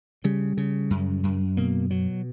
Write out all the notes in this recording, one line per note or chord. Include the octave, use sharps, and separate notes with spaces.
C#3 G3
C#3
F#2
F#2
B2 A#3
B2 F#3